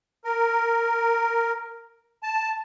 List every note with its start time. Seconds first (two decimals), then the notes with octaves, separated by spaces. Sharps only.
0.25 A#4
2.23 A5